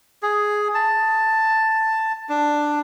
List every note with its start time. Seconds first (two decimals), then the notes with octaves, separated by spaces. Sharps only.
0.23 G#4
0.75 A5
2.29 D4